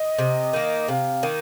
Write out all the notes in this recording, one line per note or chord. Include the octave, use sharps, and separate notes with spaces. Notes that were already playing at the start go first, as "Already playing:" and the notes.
Already playing: D#5
C3
D#3 A#3
C3 F5
D#3 A#3